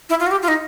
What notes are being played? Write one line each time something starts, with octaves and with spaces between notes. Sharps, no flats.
E4
F4
F#4
G4
F4
D#4